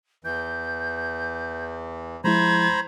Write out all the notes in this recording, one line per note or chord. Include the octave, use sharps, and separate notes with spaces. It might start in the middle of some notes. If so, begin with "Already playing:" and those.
E2 E3 G6
F3 G#3 E4 C5 A#5 B5 G#6